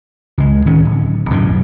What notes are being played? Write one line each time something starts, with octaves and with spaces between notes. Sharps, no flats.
C#2 G#3
D1 D#3 C#4
D1
B1 F#2 A2 D3